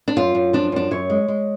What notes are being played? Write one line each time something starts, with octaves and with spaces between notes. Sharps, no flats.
D4
F#2 F4
F#2
F3 D4
F#2 D4
F#2 C#5
G#3
G#3